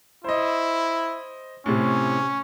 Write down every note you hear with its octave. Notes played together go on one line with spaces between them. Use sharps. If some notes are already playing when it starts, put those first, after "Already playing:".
E4 C5 D#5
A2 C3 C#4